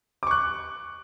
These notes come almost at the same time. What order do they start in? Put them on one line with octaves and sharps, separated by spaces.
D6 C#6 F#6